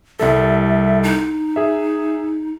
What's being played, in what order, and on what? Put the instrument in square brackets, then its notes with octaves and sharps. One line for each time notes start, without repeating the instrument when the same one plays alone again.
[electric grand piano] C2 G3 A4 [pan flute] E5
[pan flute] D#4
[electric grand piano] G#4 E5